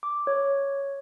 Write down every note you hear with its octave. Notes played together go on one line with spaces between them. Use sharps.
D6
C#5